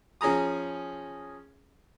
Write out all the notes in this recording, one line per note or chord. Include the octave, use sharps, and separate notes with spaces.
F3 C#4 G#4 A#5 D#6